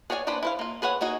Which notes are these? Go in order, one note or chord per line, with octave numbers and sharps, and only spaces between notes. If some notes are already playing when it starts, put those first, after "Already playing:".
G#4 C#5 D5 G5 G#5
A#3 D4 B4 C5 B5
E4 C5 F5
A#3 F4
G#4 B4 C#5 F#5
A#3 D#4 F#4 G#4